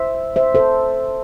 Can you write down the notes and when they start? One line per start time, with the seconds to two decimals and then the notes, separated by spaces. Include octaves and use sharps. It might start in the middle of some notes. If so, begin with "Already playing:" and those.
Already playing: C5 E5
0.36 C5 E5
0.55 A4 C5